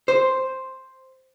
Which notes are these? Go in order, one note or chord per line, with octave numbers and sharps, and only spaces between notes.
C5